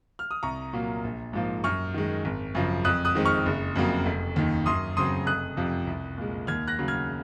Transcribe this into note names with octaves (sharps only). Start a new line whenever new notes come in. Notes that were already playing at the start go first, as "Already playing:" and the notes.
F6
D#6
C2 A#5 C#6
A#2 F#3 A#3
A#1
G#2 F3 A#3
F#2 C#6 F6
D#3 G#3
G#1
F#2 C#3 F3
F2 D#6 F#6
D#6 F#6
D#3 G#3 C4
C#6 F6
F#1
F2 C#3 F#3 A#3
F1
D#2 D#3
F#2 C6 D#6
C#3 F#3 C4 C6 D#6
F1 D#6 F#6
F2 C3 F3
C2
A#2 G#3
D#2 F6 G#6
F#6 A#6
C#3 F#3
F6 G#6